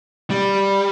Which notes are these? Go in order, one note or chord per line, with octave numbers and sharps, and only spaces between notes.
G3